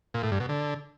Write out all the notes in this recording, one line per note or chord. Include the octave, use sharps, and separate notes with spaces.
A#2
A2
G2
B2
D3